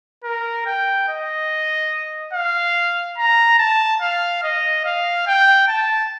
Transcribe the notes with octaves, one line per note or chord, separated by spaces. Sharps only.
A#4
G5
D#5
F5
A#5
A5
F5
D#5
F5
G5
A5